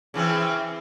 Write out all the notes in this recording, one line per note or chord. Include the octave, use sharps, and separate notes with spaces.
C#3 E3 C4